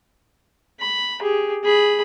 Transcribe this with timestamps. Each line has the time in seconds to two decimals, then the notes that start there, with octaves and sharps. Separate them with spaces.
0.80 B5
1.20 G4 G#4
1.64 G#4 B5